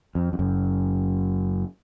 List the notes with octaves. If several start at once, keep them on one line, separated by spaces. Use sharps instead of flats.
F2
F2
F#1 F#2